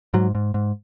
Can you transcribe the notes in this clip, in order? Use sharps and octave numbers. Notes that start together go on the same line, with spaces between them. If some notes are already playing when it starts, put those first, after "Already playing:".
G#2 F#3
G#2
G#2